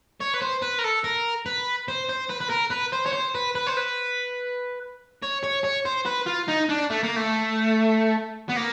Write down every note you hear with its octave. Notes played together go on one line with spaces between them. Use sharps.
C#5
B4
C5
B4
A#4
A4
A#4
B4
C5
C5
B4
B4
A#4
B4
C5
C#5
C5
B4
B4
C5
B4
C#5
C#5
C#5
C5
B4
F4
D#4
D4
A3
A#3
A3
B3
A#3